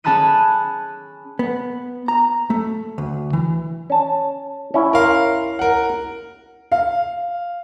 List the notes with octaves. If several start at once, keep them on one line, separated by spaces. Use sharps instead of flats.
C#4 G#4 A5 B5 F#6 D#7
B3
A#5
A3
D2
E3
C#4 A5
C#4 E4
A#4 F5 C6
A#4 F#5
F5